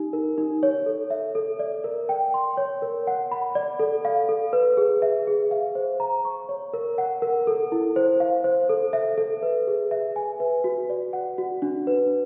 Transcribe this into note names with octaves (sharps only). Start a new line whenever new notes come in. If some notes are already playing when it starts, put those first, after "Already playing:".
Already playing: D#4 G4
A#4
D#4
C#5
A4
E5
A4
D5
A#4
G5
C6
C#5
A#4
F#5
B5
D5
A4
F5
A4
B4
G#4
E5
G#4
F5
C5
A#5
C#6
C#5
A#4
F#5
A#4
A4
E4
C5
F5
C5
A4
E5
A4
B4
G#4
E5
G#5
B4
F#4
D5
F#5
F#4
D4
B4